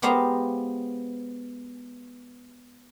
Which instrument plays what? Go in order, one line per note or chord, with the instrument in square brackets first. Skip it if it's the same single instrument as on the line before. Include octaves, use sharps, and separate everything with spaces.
[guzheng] G#3 B3 G4 C5 F5 A#5